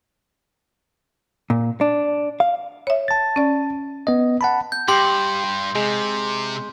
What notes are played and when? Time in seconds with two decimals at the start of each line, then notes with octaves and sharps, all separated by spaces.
1.50 A#2
1.81 D4
2.40 F5
2.87 C#5 E5
3.08 A5 A6
3.36 C#4 D5
4.07 B3 D#5
4.41 F#5 A5 B5
4.72 G6
4.88 G2 G4 C6
5.75 C3 G#3